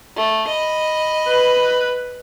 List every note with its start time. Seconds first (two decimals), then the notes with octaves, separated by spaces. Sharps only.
0.17 A3
0.49 D#5 B5
1.28 B4